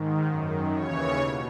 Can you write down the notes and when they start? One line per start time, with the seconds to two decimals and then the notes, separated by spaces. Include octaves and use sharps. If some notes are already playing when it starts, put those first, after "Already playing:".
Already playing: G#2 D#3
0.27 F#2 D#3
0.74 D#2 C#3 E3 C#5
1.20 B2